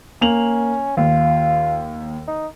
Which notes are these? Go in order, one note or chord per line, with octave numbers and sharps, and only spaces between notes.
A#3 C#4 F7 F#7
D#2 F4
D#4